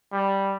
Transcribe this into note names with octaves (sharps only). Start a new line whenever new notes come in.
G3